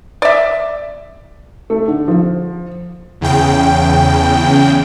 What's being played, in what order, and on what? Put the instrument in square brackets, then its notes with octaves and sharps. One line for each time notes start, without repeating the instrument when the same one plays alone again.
[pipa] D5 E5
[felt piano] A3
D3
F3
[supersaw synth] E2 C#3 G5